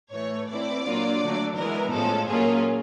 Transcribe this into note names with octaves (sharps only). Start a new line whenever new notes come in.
A2 E3 A3 C#5
E3 A3 C4 E4 D5
A#2 F#3 A#3 D4 F4
D3 F#3 A3 D4
E3 G#3 B3 E4 A#4
A2 F3 G#3 C#4 A4
A#2 F#3 A#3 C#4 F4 G#4